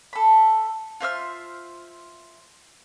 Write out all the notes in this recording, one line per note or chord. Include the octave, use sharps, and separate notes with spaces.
A4 B5
F4 C5 E5 F6